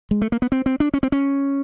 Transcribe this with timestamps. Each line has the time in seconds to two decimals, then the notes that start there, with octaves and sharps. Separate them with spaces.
0.11 G#3
0.22 A3
0.32 A#3
0.42 B3
0.52 C4
0.66 C4
0.80 D4
0.94 C#4
1.03 C4
1.12 C#4